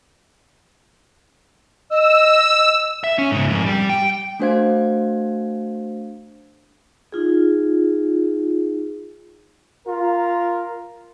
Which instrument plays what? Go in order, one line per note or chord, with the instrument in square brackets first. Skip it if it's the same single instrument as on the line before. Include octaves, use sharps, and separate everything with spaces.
[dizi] D#5 [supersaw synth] E6
[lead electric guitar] E5
C#4
G#2 C#3
F2 G#2
G3
G5
[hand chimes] A3 D4 F#4 C5 F5 G#6
[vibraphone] D#4 F4 G#4
[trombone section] F4 A#4